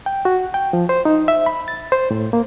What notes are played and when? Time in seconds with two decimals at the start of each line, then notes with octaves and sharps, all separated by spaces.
0.06 G5
0.25 F#4
0.54 G5
0.73 F3
0.89 C5
1.05 D#4
1.28 E5
1.46 B5
1.68 A6
1.92 C5
2.11 A2
2.33 A#3